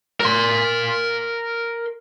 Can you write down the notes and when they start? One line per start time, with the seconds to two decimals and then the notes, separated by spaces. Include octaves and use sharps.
0.20 A#4 C6